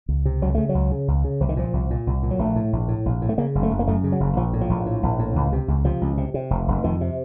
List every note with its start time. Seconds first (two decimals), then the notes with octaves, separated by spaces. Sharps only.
0.09 C#2
0.25 C3
0.42 C#2 F#3
0.55 C#3 A3
0.69 F#3
0.75 C#2
0.92 C#3
1.08 C#2
1.24 C#3
1.40 C2 F3
1.49 D#3
1.57 A#2 F3
1.73 C2
1.90 A#2
2.07 C2
2.23 A#2
2.31 F#3
2.39 A#1 A3
2.56 A2
2.73 A#1
2.88 A2
3.06 A#1
3.22 A2
3.29 A3
3.38 C#3 A#3
3.55 F#1
3.63 A3
3.71 F#1
3.79 A#3
3.87 F#2 A3
4.04 C#3
4.12 F#3
4.20 F#1
4.36 A#1 F3
4.53 A2
4.61 F3
4.69 A#1
4.86 A2
5.03 A#1
5.19 A2
5.36 C#2
5.52 C3
5.68 C#2
5.85 C3 F3
6.01 C#2
6.17 C3
6.34 C3
6.50 F1
6.68 F1
6.84 F2 D#3
7.01 C3